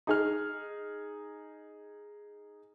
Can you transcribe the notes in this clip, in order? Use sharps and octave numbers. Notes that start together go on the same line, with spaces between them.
D#4 G#4 F6